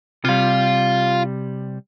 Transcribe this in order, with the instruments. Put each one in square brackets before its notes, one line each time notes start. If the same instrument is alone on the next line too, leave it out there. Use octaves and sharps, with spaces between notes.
[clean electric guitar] C3 G3 [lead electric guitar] F4 F5